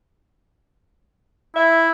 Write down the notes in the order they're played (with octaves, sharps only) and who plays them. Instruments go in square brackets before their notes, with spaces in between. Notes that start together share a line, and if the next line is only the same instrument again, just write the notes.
[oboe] E4 [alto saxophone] E5